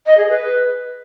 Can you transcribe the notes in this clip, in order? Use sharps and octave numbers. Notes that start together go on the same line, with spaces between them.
D#5
G#4
B4